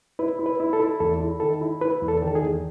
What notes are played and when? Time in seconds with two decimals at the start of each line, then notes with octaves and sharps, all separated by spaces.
0.19 E4 B4
0.39 E4
0.46 B4
0.60 E4
0.73 A4
0.80 E4
1.00 E2 A4
1.20 E4
1.40 D#3 A4
1.61 E4
1.81 E4 B4
2.02 E2
2.08 A4
2.22 D#3
2.28 A4
2.35 G#4
2.42 E2